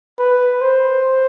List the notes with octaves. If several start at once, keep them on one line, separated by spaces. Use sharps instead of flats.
B4
C5